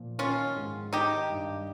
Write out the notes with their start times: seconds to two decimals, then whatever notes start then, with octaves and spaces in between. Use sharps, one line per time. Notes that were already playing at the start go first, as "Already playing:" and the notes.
Already playing: A#2 F3
0.18 D#3 C#4 F4
0.56 G#2
0.93 D#3 D#4 G4
1.30 G2